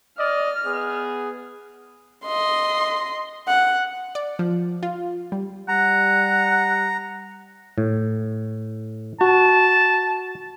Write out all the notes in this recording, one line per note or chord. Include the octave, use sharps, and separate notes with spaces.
D5 D#5 F6
B3 G#4
D#5 C6
F#5
D5
F3
F4
G3
G3 F#5 A#5
A2
F#4 A5